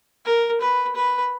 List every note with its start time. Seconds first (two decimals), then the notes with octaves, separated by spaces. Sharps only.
0.25 A#4
0.61 B4
0.96 B4